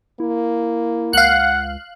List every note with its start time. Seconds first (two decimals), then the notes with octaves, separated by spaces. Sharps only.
0.20 A#3 E4
1.13 C#2 F5 F#5 F#6